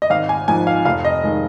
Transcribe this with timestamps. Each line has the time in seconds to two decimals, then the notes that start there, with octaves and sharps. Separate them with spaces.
0.02 D#5
0.10 G#1 F5
0.29 G#5
0.48 G#2 F3 G#5
0.67 F5
0.85 F1 F5
1.05 D#5
1.24 D#3 G#3